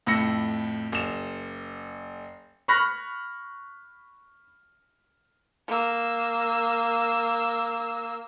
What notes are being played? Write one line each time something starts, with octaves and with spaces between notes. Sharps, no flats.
F2 A2 B5 E6 A#6 C#7
F#1 E7
B5 C#6 F6 F#6 A#6 B6
A#3 E6